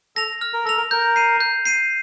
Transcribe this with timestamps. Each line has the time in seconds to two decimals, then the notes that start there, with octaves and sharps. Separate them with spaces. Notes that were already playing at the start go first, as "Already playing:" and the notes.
0.16 A4 A#6 F7
0.41 F6
0.53 A#4
0.65 A4 A#6 F7
0.77 A#4
0.91 A#4 G6
1.16 C7 D#7
1.41 G6
1.66 C7 D#7